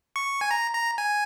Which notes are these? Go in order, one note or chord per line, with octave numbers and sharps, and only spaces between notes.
C#6
G#5
A#5
A#5
G#5